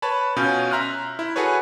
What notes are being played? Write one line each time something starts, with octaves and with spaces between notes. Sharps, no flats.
B4 C#5 A5 B5
B2 C#4 F4 G#5 G6
E5 A#5 C6 F6 F#6
E4
F#4 G#4 A4 B4 C#5